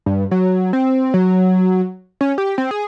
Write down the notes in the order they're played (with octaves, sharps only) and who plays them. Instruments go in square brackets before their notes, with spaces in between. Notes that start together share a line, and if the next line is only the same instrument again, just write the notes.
[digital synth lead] G2
F#3
C4
F#3
C#4
G4
C4
G#4